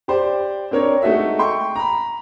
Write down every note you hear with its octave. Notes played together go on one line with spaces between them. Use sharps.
G4 C5 D5
C4 D4 A#4 C#5
G#3 A3 D#4 F#4 E5
G5 C6 C#6
A#5 B5